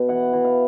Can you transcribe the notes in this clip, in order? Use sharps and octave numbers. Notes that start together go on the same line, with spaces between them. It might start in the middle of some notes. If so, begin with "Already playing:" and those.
Already playing: B2
E3 F#5
E3
F5